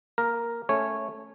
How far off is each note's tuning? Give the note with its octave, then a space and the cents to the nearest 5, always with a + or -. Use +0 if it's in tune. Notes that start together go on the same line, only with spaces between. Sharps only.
A#3 +0 A#4 +0
A3 +0 C#4 +0 C#5 -10